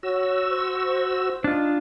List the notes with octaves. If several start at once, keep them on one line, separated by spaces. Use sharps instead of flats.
F#4 C#5 E6
C5
D4 D#4 F4